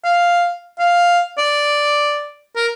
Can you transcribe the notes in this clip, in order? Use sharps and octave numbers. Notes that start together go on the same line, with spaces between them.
F5
F5
D5
A#4